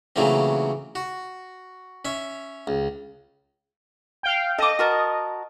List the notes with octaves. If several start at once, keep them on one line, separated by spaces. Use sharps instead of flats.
A#2 C#3 E3 F#3 A3 C4
F#4
C#4 E5
C#2
F5 G5
A4 D#5 D6
F#4 A#4 A5